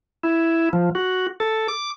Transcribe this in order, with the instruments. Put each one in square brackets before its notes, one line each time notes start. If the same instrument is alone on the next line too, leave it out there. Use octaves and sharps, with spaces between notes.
[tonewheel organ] E4
F3
F#4
A4
D6